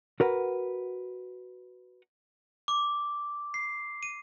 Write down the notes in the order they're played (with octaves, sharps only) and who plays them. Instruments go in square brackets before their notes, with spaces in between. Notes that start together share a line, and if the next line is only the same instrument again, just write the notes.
[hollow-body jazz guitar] F#4 A#4 B4 F#5
[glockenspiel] D6
C7
D#7